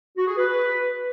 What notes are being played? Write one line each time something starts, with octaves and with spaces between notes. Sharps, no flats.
F#4
G#4
B4